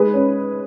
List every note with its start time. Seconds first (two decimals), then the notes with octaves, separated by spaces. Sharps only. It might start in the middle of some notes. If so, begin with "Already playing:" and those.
Already playing: G#3 G#4 B4
0.14 C#4